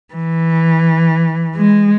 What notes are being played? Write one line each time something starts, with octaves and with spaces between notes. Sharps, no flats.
E3
G#3